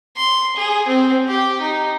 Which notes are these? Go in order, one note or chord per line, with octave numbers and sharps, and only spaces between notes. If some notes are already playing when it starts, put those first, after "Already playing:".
C6
G#4
C4
G4
D#4